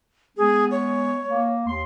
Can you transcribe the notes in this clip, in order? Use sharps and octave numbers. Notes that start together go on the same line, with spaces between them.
G#3 B3 G#4
C#5
A#3
D#2 C6